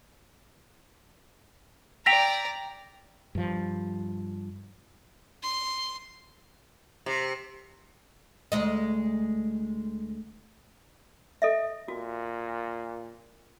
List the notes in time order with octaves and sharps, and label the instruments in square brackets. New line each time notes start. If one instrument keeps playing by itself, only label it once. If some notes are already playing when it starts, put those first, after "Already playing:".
[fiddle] D5 A#5 [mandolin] G5 A5 E6 [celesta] A#6 B6 F7
[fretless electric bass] G2 F3
[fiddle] C6
[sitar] C3
[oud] D2 G#3 D#5
[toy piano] A4 D#5 E5
[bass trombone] A#2 [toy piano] F#4